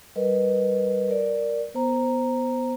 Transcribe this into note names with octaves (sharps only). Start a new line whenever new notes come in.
G3 A#4 B4 D#5
A#4 D5
B3 C5 A#5